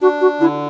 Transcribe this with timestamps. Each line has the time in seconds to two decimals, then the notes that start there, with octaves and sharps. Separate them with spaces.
0.01 D4 F#4
0.21 F#4
0.40 D3 E4